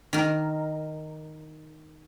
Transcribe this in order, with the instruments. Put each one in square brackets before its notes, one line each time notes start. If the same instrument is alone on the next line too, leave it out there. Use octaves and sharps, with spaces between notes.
[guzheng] D#3 A#4